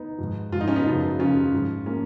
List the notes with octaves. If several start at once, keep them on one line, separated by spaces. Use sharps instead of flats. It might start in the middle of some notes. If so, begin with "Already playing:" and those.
Already playing: B3 D#4
G#2 F3
G#2 F3 F4
D#4
C#4
B3 D#4
F#2 C#3 F3
F#2 C#3 F3 C#4 F4
G#2 F3
F3 A#3 C#4